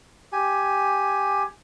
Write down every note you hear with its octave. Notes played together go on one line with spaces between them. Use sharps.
G4 G#5